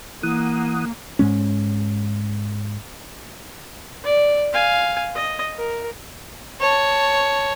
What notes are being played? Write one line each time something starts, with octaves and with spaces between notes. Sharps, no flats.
E3 A#3 F#5 D#6
G#2 G#3 C#4
D5
F5 G#5
D#5
A#4
C#5 A5